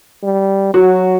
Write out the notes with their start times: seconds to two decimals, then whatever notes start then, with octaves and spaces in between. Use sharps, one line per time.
0.23 G3
0.74 F#3 F#4